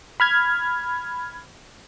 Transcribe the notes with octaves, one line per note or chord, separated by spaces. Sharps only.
B5 F6 G#6